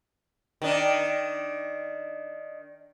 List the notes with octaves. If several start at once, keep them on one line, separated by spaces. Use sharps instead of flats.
D#3 D4